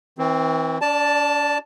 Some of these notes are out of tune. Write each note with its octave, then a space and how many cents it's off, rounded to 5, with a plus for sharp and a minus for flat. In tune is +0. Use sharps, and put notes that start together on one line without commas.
E3 -35 C4 +0
D4 -45 D5 +0 A5 +0